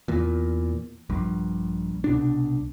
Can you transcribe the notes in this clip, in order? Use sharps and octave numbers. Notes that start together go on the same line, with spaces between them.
E2 A#2
A#1 G2
C2 B2 D4